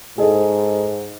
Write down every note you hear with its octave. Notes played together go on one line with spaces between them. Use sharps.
G#2 G#4 A4 D#5